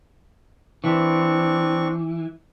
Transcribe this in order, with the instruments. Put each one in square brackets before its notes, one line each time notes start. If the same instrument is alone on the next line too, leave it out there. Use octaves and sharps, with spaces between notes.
[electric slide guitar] E3 [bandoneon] C4 D4 C#6